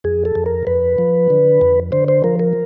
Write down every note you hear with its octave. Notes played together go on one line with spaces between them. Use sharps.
F2 G#4
A4
F2
A#4
F2 B4
F3
D3
F2
D3 C5
C5
F3 A#4
A#4